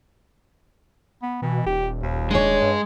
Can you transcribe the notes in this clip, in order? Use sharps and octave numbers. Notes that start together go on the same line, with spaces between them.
B3
B2 E3
D#1 G4
D#2
G#3 D4 G#4 C#5
G2